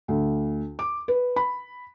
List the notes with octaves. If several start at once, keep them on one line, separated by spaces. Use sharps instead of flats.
D2
D6
B4
B5